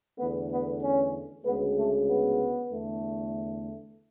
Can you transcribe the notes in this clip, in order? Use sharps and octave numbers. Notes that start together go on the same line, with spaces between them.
E2 D3 A3 B3
B3
C#4
D2 C#3 G#3 B3
A3
B3
E2 D3 A3